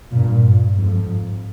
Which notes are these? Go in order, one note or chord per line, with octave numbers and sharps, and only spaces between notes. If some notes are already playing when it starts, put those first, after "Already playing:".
G2 A#2
G2
F2 G#2